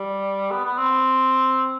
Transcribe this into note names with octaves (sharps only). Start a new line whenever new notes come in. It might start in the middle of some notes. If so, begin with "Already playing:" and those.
Already playing: G3
B3
B3
C4